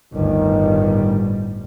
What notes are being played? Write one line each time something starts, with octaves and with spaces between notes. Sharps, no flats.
G1 D2 A2 D#3 G3